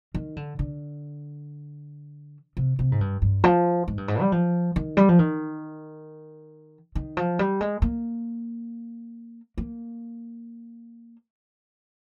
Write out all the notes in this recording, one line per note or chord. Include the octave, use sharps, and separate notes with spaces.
D#3
D3
D3
C3
C3
G#2
G2
G2
F3
G#2
G2
G#2
G3
F3
D#3
G3
F3
D#3
D#3
F3
G3
G#3
A#3
A#3